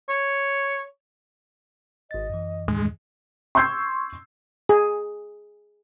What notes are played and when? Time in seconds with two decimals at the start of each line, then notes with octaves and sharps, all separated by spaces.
0.09 C#5
2.11 G#1 D#5 A6
2.30 F#2 E3
2.68 D#2 A2 G#3 D4
3.55 C6 C#6 E6 G6 G#6 C7
4.69 G#4